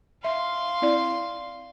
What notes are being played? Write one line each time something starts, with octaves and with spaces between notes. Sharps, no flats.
E5 F5 C6
C4 E4 D5